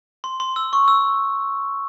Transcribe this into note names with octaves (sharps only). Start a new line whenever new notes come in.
C6
C6
E6
C#6
E6